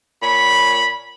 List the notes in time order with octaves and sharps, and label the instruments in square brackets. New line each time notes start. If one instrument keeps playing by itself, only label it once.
[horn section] A#2 C#5 B5